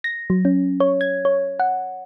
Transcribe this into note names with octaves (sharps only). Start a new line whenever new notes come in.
A#6
F#3
C#4
C#5
G#6
C#5
F#5